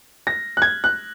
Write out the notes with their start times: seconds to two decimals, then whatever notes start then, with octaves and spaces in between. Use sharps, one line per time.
0.27 A#6
0.57 F#6
0.62 G#6
0.84 F#6